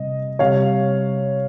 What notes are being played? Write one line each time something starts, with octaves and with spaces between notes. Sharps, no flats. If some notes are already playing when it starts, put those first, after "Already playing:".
Already playing: C3 G3 D#5
C3 G3 C#5 F5